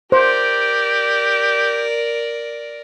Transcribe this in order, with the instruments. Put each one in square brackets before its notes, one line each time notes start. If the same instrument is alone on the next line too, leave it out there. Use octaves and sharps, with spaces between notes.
[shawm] G4 [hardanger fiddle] A#4 D5 [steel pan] C5